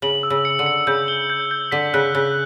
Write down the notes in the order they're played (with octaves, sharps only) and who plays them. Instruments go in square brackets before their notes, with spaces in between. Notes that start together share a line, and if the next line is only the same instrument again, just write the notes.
[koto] C#3 [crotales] F#7
[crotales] E6
[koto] C#3
[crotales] C#7
[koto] D3
[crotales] C#7
[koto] C#3 [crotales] G6
[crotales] G7
G6
G6
[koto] D3 [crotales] B6
[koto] C#3 [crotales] F#6
[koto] C#3 [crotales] F#6